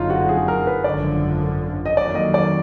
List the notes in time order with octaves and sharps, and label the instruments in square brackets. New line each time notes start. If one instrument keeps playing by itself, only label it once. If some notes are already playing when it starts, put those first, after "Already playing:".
Already playing: [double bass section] F#1 F2 D3 F#3 [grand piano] D#4 F4
[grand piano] F#4
G#4
A#4
B4
[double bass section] G#1 F#2 D3 F3 [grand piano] D5
[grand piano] D#5
[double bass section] F2 D#3 F#3 A#3 [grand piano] D5
[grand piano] D#5
D5